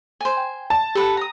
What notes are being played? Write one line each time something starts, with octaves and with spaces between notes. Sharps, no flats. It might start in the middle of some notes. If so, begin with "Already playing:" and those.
C5 G#5
G5
A5
G4 A4 B4 F#5
A#5 D#6